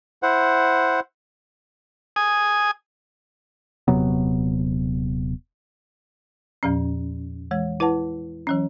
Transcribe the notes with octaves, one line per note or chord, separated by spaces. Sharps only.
E4 C5 F#5
G#5 D#6
D#1 C3 F#3 B3
E2 A#2 F3 C#4
E3 G#3
E4 B4 F#5 A5
E3 F#3 C#4